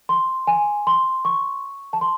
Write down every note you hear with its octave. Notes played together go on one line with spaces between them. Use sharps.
C6
G#5
C6
C#6
A5
C6